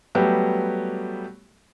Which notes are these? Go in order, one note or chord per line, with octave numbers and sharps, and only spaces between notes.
F#3 G3 A3 B3 G4